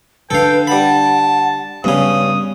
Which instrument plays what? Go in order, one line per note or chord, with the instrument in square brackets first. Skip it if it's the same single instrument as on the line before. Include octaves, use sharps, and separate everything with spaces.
[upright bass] D3 D4 [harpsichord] A4 F5 [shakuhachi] B4 [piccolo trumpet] G5
[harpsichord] G3 B5 [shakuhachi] F#5 [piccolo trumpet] A5
[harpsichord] G2 C#3 [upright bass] G3 B3 [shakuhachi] C#4 [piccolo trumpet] D#6